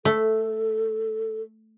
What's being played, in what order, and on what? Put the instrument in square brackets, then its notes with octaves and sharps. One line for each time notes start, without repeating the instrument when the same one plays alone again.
[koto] A3 [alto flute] A4